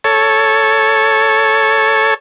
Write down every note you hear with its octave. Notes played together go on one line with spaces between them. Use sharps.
A4 C#5